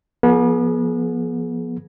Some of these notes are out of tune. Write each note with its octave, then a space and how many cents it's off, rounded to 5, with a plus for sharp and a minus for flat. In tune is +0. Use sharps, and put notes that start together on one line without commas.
F3 +0 B3 -35 G#4 +25